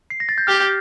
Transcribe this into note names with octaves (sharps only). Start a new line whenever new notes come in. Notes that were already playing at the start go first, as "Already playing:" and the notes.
C7
A#6
A6
G6
G4 F6